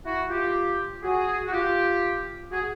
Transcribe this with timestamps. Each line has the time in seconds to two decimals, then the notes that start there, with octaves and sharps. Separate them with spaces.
0.04 E4 F#4
0.29 F4 G4
1.03 F#4 G#4
1.47 F#4
1.52 F4 G4
2.51 F#4 G#4